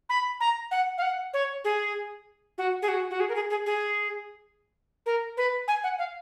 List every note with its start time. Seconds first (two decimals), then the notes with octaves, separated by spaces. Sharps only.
0.09 B5
0.40 A#5
0.71 F#5
0.98 F5
1.02 F#5
1.34 C#5
1.64 G#4
2.58 F#4
2.82 G#4
2.88 F#4
3.11 F#4
3.20 G#4
3.29 A#4
3.35 G#4
3.50 G#4
3.66 G#4
5.06 A#4
5.37 B4
5.68 G#5
5.84 F#5
5.99 F5